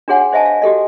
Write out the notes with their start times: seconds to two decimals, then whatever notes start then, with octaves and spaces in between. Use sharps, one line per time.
0.08 D4 F#4 G#4 C#5 F#5 G#5
0.33 C5 D#5 E5 G#5 A5
0.46 F5
0.62 F#4 G4 A4 D#5